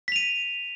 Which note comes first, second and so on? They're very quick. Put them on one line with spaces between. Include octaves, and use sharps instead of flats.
B6 F7 D#7